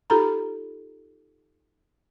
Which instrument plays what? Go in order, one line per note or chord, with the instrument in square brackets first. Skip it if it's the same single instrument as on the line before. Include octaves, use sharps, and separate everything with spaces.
[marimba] D#4 F4 G4 A4 A#5 B5